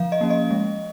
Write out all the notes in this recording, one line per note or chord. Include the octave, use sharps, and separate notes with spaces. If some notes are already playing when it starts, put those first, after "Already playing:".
Already playing: F3 F5
D#5
A#3 C#4
D#5
G#3